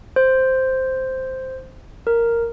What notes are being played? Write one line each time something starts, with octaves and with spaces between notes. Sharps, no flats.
C5
A#4